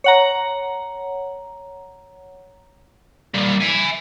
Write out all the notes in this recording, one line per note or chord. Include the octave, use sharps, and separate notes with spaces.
C#5 F#5 A#5
G3 A#3
E5 G#5